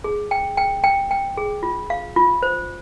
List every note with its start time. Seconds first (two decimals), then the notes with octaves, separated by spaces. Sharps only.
0.04 G#4
0.31 G5
0.57 G5
0.84 G5
1.11 G5
1.37 G#4
1.63 F4
1.90 F5
2.16 F4
2.43 C5